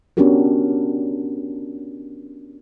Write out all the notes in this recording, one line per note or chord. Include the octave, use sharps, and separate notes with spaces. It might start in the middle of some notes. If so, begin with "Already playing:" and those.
B3 C#4 D4 F#4 G4 A#4